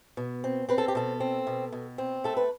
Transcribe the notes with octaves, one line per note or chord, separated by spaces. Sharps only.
B2
C4
C4 B4
A4
G4
B2 A4
C4
B2
B2
C4
A3 A4
B4